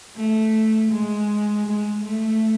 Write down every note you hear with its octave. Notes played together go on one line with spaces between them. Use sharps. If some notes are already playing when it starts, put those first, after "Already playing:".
A3
G#3
G#3
A3